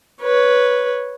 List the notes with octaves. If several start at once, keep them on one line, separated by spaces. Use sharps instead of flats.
B4 C#5